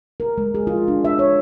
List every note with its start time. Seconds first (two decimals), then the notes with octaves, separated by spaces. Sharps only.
0.20 A#4
0.38 G#3
0.55 G#4
0.67 F4
0.88 D4
1.05 E5
1.19 C#5